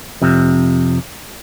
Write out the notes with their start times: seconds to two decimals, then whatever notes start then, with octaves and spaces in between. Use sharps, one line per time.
0.22 F2 C3